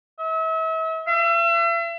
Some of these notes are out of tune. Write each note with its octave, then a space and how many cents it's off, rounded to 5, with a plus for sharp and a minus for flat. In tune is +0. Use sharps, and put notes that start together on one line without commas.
E5 -40
E5 +40